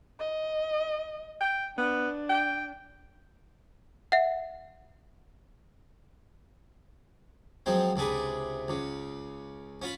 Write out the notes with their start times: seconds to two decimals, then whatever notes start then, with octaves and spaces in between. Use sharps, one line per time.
0.20 D#5
1.40 G5
1.77 B3 D4
2.29 G5
4.12 E5 F#5
7.66 F3 F#3 G#3 C4
7.96 C#2 C3 D4 G#4 B4
8.68 C#2 C#3
9.82 C#4 F4 B5